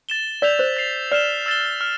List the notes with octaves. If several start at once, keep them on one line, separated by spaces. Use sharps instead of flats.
A6 E7 G7
D5 E6 G6 B6 F7
C5
A6 C7 F7
D5 F6 C7 E7 G7
E6 A6 E7 G7
F6